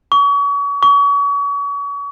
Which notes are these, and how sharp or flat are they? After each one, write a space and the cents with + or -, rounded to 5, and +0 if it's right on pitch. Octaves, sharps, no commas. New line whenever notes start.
C#6 +35
C#6 +35